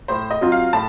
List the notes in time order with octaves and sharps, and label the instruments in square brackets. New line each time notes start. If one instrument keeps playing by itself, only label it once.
[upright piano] A2 [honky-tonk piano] C5
[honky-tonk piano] D#5
[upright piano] F#3 C4 F4
[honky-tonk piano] F5
[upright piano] A2 [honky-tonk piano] A5